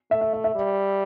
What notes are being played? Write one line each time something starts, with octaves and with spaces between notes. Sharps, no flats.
A3 E5
E5
E5
E5
G3